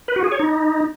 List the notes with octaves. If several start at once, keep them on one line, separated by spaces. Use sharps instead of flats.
B4
F#4
G#4
C#5
D#4